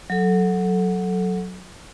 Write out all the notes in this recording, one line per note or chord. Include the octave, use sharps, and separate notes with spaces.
F#3 A4